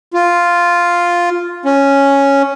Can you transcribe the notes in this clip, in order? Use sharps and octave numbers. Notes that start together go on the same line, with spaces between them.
F4
C#4